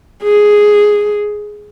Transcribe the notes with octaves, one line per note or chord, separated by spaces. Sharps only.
G#4